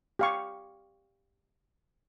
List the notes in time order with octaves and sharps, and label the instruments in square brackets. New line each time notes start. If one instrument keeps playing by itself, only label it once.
[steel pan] G4 F5 C#6